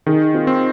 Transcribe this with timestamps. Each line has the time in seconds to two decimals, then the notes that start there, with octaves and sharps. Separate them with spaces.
0.06 D#3 D#4 G#4
0.34 C4 F4
0.47 C4